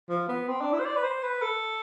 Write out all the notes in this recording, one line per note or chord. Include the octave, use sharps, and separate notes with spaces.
F3
B3
C4
D4
E4
C5
D5
B4
C5
B4
A4